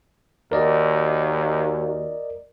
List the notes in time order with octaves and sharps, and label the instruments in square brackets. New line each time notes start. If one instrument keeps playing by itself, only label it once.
[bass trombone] D#2 [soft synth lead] F#4 [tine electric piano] A#4 D5 D#5